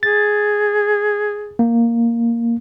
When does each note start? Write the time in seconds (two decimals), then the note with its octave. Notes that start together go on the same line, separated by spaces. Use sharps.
0.03 G#4 A6
1.59 A#3